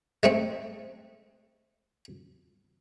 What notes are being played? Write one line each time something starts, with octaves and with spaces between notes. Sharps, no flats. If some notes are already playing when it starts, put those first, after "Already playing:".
G#3 A3 C4